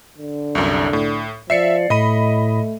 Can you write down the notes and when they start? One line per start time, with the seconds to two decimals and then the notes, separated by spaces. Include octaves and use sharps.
0.18 D3
0.55 C2 F#2
0.93 A2
1.50 F3 D5 E5 C7 C#7
1.90 A2 A3 D#5 B5 D#7